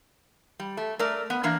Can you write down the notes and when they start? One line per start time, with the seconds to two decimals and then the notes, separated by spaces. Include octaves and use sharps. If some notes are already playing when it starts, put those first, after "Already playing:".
0.60 G3
0.77 A3
0.99 A3 A#4 D5
1.30 B3
1.43 E3 A#3 D4